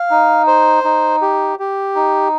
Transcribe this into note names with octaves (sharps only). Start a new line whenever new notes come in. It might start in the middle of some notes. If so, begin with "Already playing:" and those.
Already playing: F5
D#4
C5
D#4
G4
G4
D#4